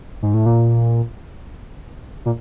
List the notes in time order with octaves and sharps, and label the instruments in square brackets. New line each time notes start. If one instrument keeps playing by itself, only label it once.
[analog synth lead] G#2
A2
A#2
A#2